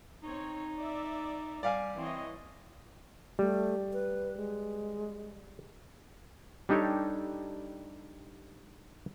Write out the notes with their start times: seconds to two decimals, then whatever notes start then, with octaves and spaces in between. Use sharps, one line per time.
0.23 C4 D#4 C#5
0.79 D5 E5
1.63 G3 D5 F5 G#5
1.97 E3 C4 C#5 D#5
3.39 G3 A3
3.93 B4
4.37 G#3
6.69 G3 D4 D#4 G4 A4 C#5